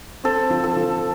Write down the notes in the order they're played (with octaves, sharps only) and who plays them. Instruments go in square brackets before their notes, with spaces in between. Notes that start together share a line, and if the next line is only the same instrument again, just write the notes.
[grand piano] C4 [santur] A4
[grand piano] F3
[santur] A4
[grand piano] F3